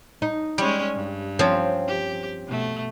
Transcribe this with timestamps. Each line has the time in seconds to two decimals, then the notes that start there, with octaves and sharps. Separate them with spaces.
0.22 D#4
0.58 G3 G#3 C#4 C#5
0.95 G2
1.39 F3 C4 C#4
1.87 G4
2.47 B2 A3